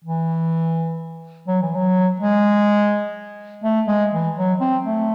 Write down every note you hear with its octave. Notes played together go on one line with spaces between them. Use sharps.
E3
F#3
E3
F#3
G#3
A3
G#3
E3
F#3
C4
A3